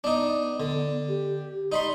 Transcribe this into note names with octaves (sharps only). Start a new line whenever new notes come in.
B3 D4 D#4
D3
G4
D#4 D5 B5 C6